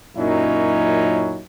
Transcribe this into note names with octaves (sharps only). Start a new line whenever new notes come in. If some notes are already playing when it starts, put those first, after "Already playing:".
F#2 A#2 F#3 C#4 D#4 E4